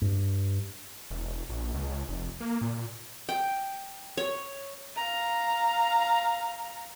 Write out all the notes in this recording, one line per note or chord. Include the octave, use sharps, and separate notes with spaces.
G2
E1
A#1
C#2
C#2
F1
A#3
A#2
G5
C#5
F5 A#5